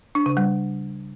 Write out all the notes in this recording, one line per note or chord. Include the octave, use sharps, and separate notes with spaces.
D4
C#3
G3